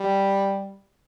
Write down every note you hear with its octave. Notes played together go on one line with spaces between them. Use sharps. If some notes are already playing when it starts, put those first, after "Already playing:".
Already playing: G3